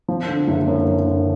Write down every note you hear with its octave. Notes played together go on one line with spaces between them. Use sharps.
F3
D3
F#1
F#2
F#2
D3